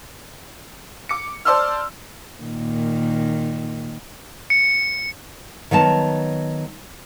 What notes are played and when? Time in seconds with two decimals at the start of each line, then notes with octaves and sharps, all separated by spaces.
1.09 D6 C#7
1.45 C5 D5 A5 C6 E6 F6
2.43 A#2 D#3
4.50 C#7
5.71 D#3 F#3 B3 A5